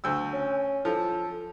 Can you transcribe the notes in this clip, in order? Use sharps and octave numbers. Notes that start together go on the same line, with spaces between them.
D2 E6
C#4
F3 A4